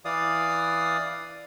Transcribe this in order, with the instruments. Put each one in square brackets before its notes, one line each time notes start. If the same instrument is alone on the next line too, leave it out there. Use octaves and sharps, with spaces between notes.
[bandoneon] E3 D5 F5 D#6